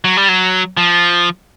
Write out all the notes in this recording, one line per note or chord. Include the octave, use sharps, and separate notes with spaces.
F#3
G3
F#3
F3